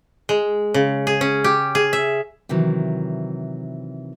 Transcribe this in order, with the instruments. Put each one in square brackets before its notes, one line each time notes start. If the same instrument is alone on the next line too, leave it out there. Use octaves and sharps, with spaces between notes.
[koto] G#3
C#3
G#4
C#4
G4
G#4
E5
[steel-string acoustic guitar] C3 D#3 E3 F#3